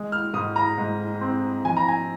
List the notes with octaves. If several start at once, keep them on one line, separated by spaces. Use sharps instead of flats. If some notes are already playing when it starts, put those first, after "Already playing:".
Already playing: G#3
F6
G#2 D#6
A#5
G#2
C4
F3 G#5
A#5
G#5